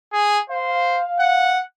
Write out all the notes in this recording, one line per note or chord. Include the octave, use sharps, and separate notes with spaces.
G#4
C5 F5
F#5